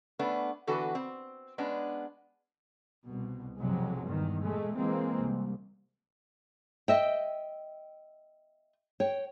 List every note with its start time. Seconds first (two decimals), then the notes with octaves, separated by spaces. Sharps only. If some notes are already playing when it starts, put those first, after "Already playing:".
0.19 A3 B3 C#4 D4
0.67 D3 E3 B3 F#4 A4 B4
0.95 C4
1.58 G#3 B3 C#4 D4
3.04 C2 B2
3.59 B1 F2 C3 F#3 G#3
4.05 E2 G2 D#3
4.43 A#2 G#3 A3
4.76 E3 G#3 A#3 C4
5.21 C2
6.88 D#5 E5 G5
9.00 C#5 G5